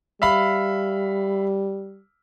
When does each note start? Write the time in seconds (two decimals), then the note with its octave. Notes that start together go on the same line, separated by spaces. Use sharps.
0.22 G3 E5 F5 B5